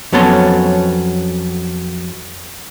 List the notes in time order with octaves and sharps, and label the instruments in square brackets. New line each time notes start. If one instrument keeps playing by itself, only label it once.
[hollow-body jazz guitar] F2 F#3 B3 C#4 A4 C6